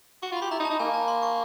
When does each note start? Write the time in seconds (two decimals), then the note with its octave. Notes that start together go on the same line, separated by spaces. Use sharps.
0.23 F#4 C#6
0.32 F4 B5
0.42 G4
0.51 E4 A#5
0.60 D#4
0.65 A5
0.70 D#4
0.80 A#3 G#5
0.94 A5
1.08 C6
1.22 C#6